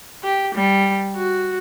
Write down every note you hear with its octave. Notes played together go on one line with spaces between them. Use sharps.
G4
G3
F#4